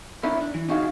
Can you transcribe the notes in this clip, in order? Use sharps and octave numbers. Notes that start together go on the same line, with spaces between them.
C#4 D4 E4 A#4
D4
E3
C#4 D#4 F#4 G#4 F5